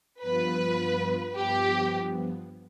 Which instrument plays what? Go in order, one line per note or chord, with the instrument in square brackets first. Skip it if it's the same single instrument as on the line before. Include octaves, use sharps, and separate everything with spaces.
[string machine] G2 F3 B3 F4 [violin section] B4
[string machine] G2 F3 B3 [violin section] G4